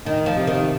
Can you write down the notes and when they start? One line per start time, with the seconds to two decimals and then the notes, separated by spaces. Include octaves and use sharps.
0.05 D#3 D#4
0.26 F3
0.36 C3
0.47 D#3